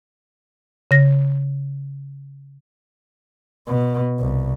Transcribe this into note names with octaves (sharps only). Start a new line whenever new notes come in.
C#3 A#6
B2
C2